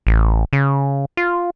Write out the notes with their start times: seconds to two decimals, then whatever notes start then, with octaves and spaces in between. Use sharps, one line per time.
0.07 A1
0.53 C#3
1.17 F4